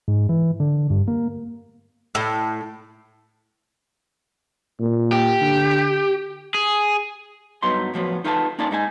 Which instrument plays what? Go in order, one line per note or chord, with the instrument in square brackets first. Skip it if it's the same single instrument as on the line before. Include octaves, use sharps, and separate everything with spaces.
[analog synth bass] G#2
E3
D3
G2
A#3
[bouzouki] A2
[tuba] A#2
[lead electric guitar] G4
[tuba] D3
[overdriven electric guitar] G#4
[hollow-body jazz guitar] G2 F#3 B3 D#4 C6
A2 F3 F#3 B3
D#4 F4 A4 B4 F#5 A5
A#3 C#4 D#4 F4 D5 A5
G#2 D#4 A4 G#5